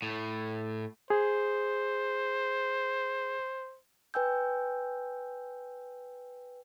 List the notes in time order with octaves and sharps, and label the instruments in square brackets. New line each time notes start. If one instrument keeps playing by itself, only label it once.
[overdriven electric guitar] A2
[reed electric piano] G#4 [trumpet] C5
[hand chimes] B4 G5 G#5 E6 G6